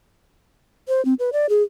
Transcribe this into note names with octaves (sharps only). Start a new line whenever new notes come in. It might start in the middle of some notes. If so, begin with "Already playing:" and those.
C5
C4
B4
D5
G#4